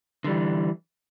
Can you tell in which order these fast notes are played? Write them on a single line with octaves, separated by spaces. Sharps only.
D3 G3 E3